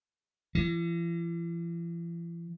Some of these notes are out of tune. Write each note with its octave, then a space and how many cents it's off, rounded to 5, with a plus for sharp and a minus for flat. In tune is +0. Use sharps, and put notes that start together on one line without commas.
E3 +45